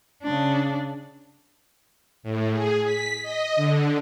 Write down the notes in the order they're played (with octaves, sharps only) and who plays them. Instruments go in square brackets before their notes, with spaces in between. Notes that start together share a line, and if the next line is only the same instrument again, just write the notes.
[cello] C#3 D4
[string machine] A2
G#4
B6
D#5
D3